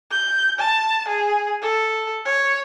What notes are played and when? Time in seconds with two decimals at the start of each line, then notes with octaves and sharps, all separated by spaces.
0.11 G6
0.59 A5
1.08 G#4
1.62 A4
2.25 C#5